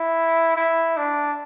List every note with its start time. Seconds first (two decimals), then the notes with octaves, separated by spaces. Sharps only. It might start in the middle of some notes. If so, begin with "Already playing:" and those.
Already playing: E4
0.56 E4
0.97 D4